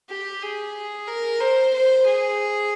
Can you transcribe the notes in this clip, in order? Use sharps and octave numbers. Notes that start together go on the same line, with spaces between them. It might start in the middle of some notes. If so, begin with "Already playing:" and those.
G4
G#4
A#4
C5
C5
G#4